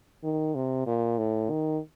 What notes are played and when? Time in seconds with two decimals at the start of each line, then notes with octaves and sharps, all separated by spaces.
0.24 D#3
0.55 C3
0.87 A#2
1.18 A2
1.50 D#3